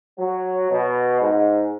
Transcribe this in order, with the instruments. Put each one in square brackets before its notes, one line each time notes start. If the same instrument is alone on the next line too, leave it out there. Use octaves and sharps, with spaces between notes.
[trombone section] F#3
B2
G#2